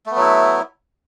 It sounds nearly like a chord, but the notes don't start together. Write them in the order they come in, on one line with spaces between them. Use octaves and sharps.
A3 B3 F#3 E4